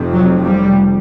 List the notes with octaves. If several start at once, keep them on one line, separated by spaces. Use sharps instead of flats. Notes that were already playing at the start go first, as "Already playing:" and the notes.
Already playing: F1 F2 C3
F#3
G3